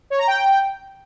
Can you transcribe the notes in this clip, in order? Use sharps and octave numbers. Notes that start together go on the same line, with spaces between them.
C#5
A#5
G5